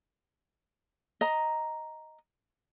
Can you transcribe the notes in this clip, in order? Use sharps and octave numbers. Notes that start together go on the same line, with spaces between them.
D#5 A#5